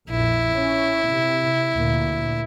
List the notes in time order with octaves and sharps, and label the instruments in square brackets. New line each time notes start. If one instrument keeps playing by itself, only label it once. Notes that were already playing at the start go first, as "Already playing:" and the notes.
[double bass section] A#1 F2 [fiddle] E4
[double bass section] C#4
C3
D2 A#2 A#3